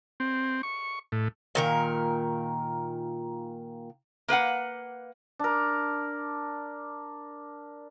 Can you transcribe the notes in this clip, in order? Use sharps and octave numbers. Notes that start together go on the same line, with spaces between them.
C4
C#6
A2
A#2 D#3 A#4
A#3 B4 F5 F#5
D4 A#4